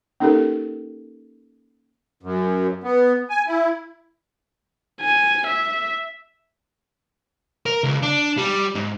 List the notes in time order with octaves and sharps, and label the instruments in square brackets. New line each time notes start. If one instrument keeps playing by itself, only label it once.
[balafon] A#3 C#4 D#4 G4 A4 A#4
[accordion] F#2
B3
G#5
E4
[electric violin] G#5
E5
[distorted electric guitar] A#4
C#2
D4
G3
G#2